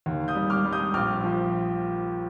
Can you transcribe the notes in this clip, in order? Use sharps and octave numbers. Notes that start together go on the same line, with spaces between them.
D#2
D#6 G6
G3
D6 F6
G3
D#6 G6
A#1 D6 F6
F3